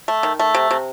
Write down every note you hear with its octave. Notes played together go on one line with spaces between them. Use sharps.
A3
D#3
A3
C3
C3